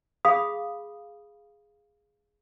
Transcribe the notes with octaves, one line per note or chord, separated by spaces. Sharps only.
G#4 F5 B5 D#6